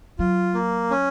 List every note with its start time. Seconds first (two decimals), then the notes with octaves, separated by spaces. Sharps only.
0.19 F#3 F4
0.54 A#3
0.90 C#4